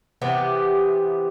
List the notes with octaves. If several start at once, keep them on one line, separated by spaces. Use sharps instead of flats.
C3 E3 B3 G4